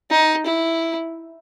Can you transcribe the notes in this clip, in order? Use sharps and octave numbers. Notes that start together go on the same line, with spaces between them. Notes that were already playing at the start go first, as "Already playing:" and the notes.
D#4
E4